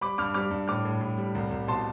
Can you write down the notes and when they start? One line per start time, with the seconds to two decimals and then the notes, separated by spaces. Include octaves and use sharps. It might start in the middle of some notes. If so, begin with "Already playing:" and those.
0.01 G3 B5 D6
0.18 G2 D6 F6
0.34 G3 D6 F6
0.51 G2
0.68 A2 D6 F6
0.85 A2
1.01 A2
1.17 G3
1.35 C2
1.51 C2
1.67 B2 A5 C6